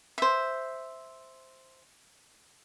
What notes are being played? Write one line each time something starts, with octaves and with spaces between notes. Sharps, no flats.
C5 E5